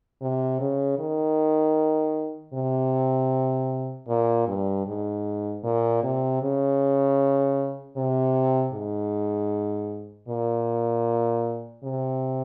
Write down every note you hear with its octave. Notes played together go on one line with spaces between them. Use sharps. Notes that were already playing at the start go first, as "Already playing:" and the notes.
C3
C#3
D#3
C3
A#2
G2
G#2
A#2
C3
C#3
C3
G#2
A#2
C3